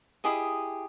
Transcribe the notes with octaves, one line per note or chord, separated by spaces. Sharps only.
E4 G4 G#4 D#5